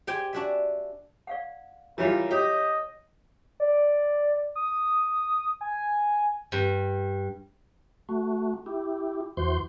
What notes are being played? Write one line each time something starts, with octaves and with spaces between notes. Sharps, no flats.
G4 C5 G5 G#5
D4 F#4 E5
D5 F5 F#5
E3 G3 E4 F4 A#4 C#5 B5
G4 C#5 D#5
D5
D#6
G#5
G2
A3 F#4
E4 G4
E2 E3 F#4 C5 C6 G6